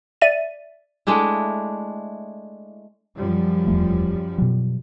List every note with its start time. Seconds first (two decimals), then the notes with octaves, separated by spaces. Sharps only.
0.22 D5 E5 A6 D#7
1.07 G#3 A3 D4 E4
3.17 F#2 F3 G3
3.67 D#1 E2 A3
4.38 B2 F#3